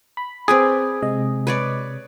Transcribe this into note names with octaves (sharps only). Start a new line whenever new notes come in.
B5
C4 G#4 B4 D5
C3 G#3 D#5
B4 C#5 D5